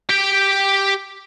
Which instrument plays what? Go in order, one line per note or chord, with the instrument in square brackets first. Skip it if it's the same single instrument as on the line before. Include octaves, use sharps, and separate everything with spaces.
[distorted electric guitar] G4 G5